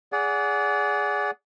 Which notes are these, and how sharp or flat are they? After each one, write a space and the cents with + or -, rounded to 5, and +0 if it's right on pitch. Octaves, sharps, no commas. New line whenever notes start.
G#4 +0 D5 -30 F#5 +0